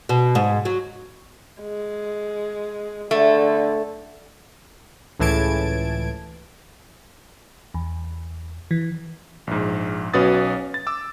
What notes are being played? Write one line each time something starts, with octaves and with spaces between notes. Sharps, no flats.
B2
G#2
F#3
G#3
D3 A3
C#2 A2 E3 A5 G#6 D7
E2
E3
A#1 G#2
B1 C#4 F#4 B4 D#6 A6
A6
D6 E6